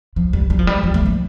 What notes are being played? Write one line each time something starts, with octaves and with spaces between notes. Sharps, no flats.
F3
G3
G3
F3
G3
F3
A3
F3